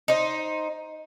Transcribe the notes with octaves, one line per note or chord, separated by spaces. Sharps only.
D#4 C5